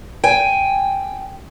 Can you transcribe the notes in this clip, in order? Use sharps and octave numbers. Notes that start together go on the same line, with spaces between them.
G5 G#5